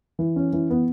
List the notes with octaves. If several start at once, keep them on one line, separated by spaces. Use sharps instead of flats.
E3
C#4
E3
B3